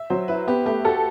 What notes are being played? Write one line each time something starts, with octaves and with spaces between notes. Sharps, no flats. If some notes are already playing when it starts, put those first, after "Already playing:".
Already playing: E5
F#3 C5
E4 B4
B3 G4
A3 G4
F#4 A4